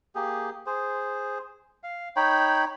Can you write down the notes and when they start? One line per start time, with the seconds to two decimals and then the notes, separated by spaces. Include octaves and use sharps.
0.15 A#3 G4 G#4
0.66 G#4 C5
1.83 F5
2.16 D#4 C#5 G5 B5